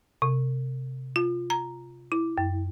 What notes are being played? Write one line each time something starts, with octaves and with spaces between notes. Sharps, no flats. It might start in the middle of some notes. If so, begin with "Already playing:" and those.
C3
F4
A#5
E4
F#2